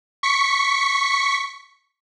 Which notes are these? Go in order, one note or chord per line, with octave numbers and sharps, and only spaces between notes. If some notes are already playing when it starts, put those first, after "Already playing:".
C#6 B6 C#7